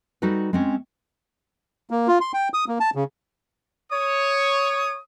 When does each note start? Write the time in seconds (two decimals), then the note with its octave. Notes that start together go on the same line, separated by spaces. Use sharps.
0.22 G3 D#4 F#4 A4 B4
0.53 G#3 C4 C#4
1.91 A#3
2.08 F4
2.21 C6
2.34 G5
2.54 D#6
2.68 A#3
2.80 A5
2.95 C#3
3.91 C#5 D#6